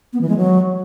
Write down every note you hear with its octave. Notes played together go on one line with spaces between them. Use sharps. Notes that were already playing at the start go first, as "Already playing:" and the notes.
B3
E3
G#3
F#3